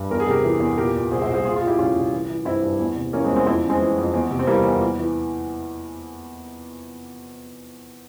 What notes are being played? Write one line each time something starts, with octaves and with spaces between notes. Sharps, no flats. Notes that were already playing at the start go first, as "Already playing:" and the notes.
Already playing: G2
E2 A#4
G#4
C3 G4 A#4
E3
E2
A#2 G4 A#4
A#2
C2 G#4 C5
C5 E5
C2
G#4 C5
A#2 F4 G#4
F4 G#4
A#2
E4 G4
C2 C#4 F4
C2
E3
E3
G2 C4 E4
G2
E2
C3
E3 A#3 C#4
G#3 C4
E2
G#3 C4
F2 C4 E4
C#3
G#3 C4
E3
F2
E2
C3
C4
E3 G3 A#3
E2
E3
E3